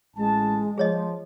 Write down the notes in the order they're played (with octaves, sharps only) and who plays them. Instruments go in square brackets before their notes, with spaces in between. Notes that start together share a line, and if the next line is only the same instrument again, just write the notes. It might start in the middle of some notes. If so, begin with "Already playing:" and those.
[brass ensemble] A1 A5 [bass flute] G#3
[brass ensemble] F3 [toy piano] G#4 C#5 D#5